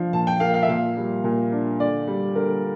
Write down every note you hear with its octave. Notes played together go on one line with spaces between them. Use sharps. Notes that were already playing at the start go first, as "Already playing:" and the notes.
Already playing: F3 D4 F5
A#2 A5
G5
A#3 F5
F5
E5
A#2 F5
G3
A#2
D4
D3 D5
G3
D3 A#4